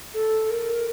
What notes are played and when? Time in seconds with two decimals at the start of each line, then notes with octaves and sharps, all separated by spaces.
0.14 A4
0.50 A#4